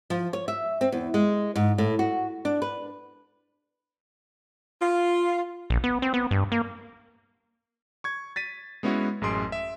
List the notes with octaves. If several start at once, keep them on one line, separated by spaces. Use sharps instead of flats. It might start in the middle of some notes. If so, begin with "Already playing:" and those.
F3
C#5
E5
C4
E2
G#3
G#2
A2
F#4
D4
B4
F4
A#1
B3
C4
B3
G2
A#3
C#6 G#6
A6 B6 D#7
G#3 B3 C#4 E4 F#4
A1 F#2 G#4 C6 D7
E5